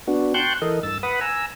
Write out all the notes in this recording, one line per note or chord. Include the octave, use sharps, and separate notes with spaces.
B3 D4 F#4
G5 A5 C6 C#6 F#6 G6
E3 A4 A#4 D#5
G2 E6 A6
B4 F#5 B5 D#6
G#5 A#5 E6